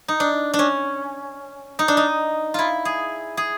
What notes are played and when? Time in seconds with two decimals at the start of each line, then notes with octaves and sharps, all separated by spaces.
0.08 D#4
0.20 D4
0.54 D4
0.59 C#4
1.79 D#4
1.88 D4
1.97 D#4
2.54 E4 F4
2.85 G#4
3.37 G#4